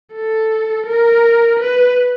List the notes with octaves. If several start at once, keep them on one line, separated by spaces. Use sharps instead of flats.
A4
A#4
B4